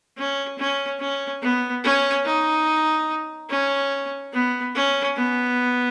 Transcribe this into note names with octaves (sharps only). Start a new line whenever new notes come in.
C#4
C#4
C#4
B3
C#4
D#4
C#4
B3
C#4
B3